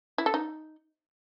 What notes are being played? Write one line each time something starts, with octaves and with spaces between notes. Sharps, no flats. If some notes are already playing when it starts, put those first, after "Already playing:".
E4
A4
D#4